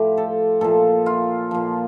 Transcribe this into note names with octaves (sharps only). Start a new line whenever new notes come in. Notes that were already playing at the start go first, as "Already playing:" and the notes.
Already playing: A2 F3 F4 G4
A4
A#2 F3 A4
F4
A#2 F3